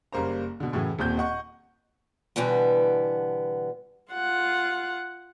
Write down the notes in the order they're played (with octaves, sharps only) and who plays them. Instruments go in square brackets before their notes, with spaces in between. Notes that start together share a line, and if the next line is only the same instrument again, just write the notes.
[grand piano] F#1 G3 A#3 C5 A#5
B2 D3
F#2 A2 C#3 E3 F#3
D#1 D#2 A#2 C4 G6
D#5 F#5 C#6
[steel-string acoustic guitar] B2 D3 E3 G3 B3
[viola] F4 F#5